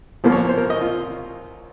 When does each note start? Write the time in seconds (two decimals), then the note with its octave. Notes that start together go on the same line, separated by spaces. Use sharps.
0.24 C2 A#2 F3 A#3
0.32 C#5
0.49 C5
0.58 A#4
0.70 D#5
0.81 F4